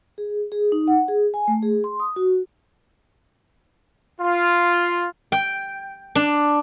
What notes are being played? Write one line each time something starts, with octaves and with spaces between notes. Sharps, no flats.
G#4
G#4
D#4
F#5
G#4
G#5
A3
G#4
C6
D#6
F#4
F4
G5
D4